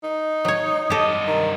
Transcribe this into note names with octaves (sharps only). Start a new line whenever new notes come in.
D#4
F#3 C#5 D#6
G2 G4 A4 D#5
D#3 A#5